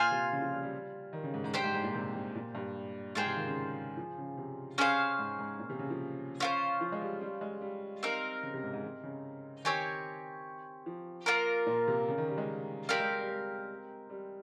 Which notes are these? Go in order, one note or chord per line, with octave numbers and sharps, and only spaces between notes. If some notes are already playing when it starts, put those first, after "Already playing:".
Already playing: A#2 F4 C5 F5 G#5
C3
C#3
F3
G3
G3
D#3
C#3
G#2
G#2
G2 G4 C5 G5
G#2
G#2
A#2
C3
C3
A#2
G2
G#2 F4 G#4 C5 G5
C3
D#3
C#3
F3
C#3
C3
C#4 G#4 C5 F5
G#2
G#2
A#2
C3
C#3
F3
C#4 F4 C5
F3
G#3
G3
G3
G#3
G3
C4 D#4 A#4 F5
C#3
C3
G#2
G#2
C3
C#3
D#3 C4 G4 C#5 G#5
F3
A#3 F4 A#4
A#2
C3
C#3
D#3
G3
G#3
G3 C4 G4 A#4 F5
G#3
G3
G3
G#3
G3